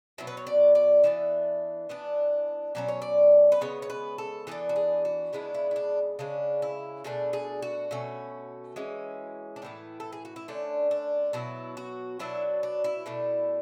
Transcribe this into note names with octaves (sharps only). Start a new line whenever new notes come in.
B2 F#3 B3 E4
B4
C#5
D5
D5
E3 B3 D4 E5
E3 B3 D4 D5
B2 F#3 C#4 D5
C#5
D5
B4
C#3 G#3 B3 C#5
C#5
B4
A4
E3 B3 D4 A4
F#4
G#4
F#4
C#3 G#3 B3 D4 E4
E4
E4
D4
C#3 G#3 C#4 D4
E4
B2 A3 D4 G#4
G#4
F#4
B2 A3 C#4
E3 G#3 C#4
D4
A2 E3 B3 E4
A4
G#4
F#4
E4
D3 A3 C#4 D4
D4
B2 F#3 B3 E4
F#4
B2 F#3 B3 D4 E4
D4
E4
B2 A3 D4